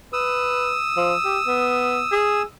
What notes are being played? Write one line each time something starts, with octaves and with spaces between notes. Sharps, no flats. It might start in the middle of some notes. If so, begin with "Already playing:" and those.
B4 D#6 E6
F3
G4
B3
G#4